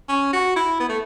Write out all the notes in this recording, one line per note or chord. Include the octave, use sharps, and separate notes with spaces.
C#4
F#4
E4
B3
A3